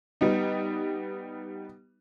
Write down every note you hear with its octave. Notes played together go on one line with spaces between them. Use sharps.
G3 B3 D#4